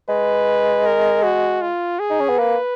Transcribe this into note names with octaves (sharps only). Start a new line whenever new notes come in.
G#3 B4
A#4
F#4
F4
G#4
D#4
C#4
B3
A#3 B4